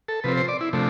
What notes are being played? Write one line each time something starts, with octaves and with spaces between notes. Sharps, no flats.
A4
C3 F3 C4 B4
C5
D5
E4
C3 F3 A3 D4